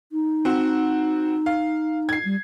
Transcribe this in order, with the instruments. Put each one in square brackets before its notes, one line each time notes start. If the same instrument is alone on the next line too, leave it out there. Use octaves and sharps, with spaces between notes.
[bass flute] D#4
[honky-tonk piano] C4 F#4
F5
G#6 C7
[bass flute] G3